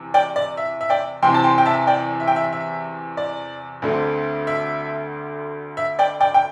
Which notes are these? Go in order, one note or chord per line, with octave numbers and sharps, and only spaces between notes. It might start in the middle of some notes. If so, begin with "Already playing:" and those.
Already playing: E2 C3
D5 G5
D5
E5
E5
D5 G5
E2 C3 E3 C4 G5 C6
A5
G5 C6
G5
E5 A5
D5 G5
E5
G5
E5
E5
D5
D2 D3 A3 C4
E5
E5
D5 G5
D5 G5
G5